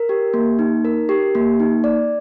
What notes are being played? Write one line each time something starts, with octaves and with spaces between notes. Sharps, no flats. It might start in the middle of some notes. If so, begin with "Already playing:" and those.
Already playing: A#4
G4
A#3
D#4
A#4
G4
A#3
D#4
D5